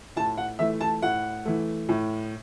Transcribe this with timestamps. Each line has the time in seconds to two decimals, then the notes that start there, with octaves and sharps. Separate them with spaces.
0.16 A2 A5
0.37 F#5
0.59 E3 A3 E5
0.81 A5
1.02 A2 F#5
1.45 E3 A3
1.89 A2